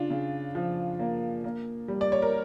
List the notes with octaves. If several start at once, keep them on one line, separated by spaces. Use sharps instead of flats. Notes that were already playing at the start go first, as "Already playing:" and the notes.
Already playing: C#3 D4 F4
C#3
F3
A#3
A#3
G3
D5
C#5
A#4